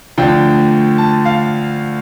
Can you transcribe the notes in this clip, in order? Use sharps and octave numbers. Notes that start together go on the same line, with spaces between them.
D2 D3 F3 G5
A5
F5